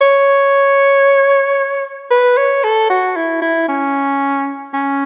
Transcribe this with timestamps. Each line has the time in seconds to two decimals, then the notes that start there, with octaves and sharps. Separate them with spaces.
0.01 C#5
2.11 B4
2.37 C#5
2.64 A4
2.90 F#4
3.16 E4
3.42 E4
3.69 C#4
4.74 C#4